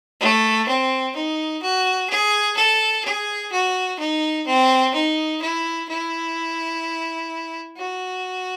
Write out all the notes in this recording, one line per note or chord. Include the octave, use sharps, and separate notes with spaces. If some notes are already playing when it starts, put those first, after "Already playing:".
A3
C4
D#4
F#4
G#4
A4
G#4
F#4
D#4
C4
D#4
E4
E4
F#4